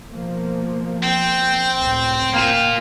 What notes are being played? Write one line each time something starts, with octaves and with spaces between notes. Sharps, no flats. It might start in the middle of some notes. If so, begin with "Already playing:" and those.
B2 F3 A#3
C4 G5
F1 C#2 A2
A#3 F4